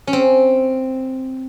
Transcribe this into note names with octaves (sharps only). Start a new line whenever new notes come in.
C#4
C4